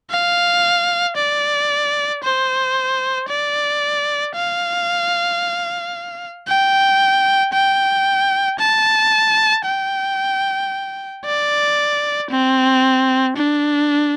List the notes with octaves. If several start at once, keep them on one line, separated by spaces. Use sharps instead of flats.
F5
D5
C5
D5
F5
G5
G5
A5
G5
D5
C4
D4